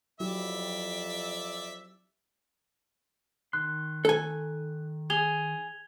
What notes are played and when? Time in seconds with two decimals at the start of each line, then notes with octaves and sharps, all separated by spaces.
0.20 F2 F#3 E4 G4 D5 E5
3.53 D#3 C6 F#6
4.05 A4 G#5
5.10 G#4 G#6 F7 G7